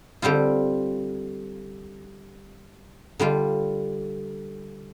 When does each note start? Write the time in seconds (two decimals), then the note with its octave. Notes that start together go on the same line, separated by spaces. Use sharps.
0.22 D3 G3 C4 F4
3.19 D3 G3 F4